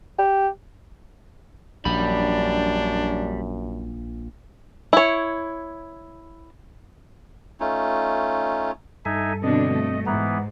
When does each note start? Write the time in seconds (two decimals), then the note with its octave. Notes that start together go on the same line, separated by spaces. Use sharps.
0.19 G4
1.85 A#1 F#2 G3 D4 B5
4.93 E4 C#5
7.60 A3 C#4 D#4 F4
9.05 G2 D#4 A4 E5 G#5
9.43 B2 D3 C4 D4 D#5
9.73 A3
10.06 G#2 E3 B3 A#5